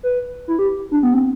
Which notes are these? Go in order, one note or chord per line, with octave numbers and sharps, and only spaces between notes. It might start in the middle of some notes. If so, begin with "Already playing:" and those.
B4
E4
G4
D4
B3
C4